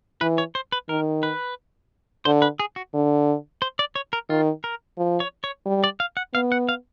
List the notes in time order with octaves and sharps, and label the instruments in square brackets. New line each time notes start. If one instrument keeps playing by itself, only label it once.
[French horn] E3 [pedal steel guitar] B4
[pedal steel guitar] C#5
C5
B4
[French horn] D#3 [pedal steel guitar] A#4
[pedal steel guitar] B4
[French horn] D3 [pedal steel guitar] C5
[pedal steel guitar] B4
G#4
F#4
[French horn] D3
[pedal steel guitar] C5
D5
C#5
A#4
[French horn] D#3 [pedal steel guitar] F4
[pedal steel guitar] A#4
[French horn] F3
[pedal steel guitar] C#5
C#5
[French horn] G3
[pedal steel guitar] D5
F5
F#5
[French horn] B3 [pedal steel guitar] F5
[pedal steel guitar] F#5
F5